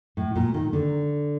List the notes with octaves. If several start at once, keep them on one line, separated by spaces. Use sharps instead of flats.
A2
A#2
D#3
D3